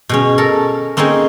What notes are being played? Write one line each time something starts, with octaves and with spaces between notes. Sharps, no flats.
B2 G#3 C#4
A4 A#4
A#3 C4 C#4 D#4 G#4